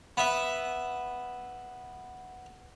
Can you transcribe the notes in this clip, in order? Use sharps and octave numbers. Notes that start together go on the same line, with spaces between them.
B3 E5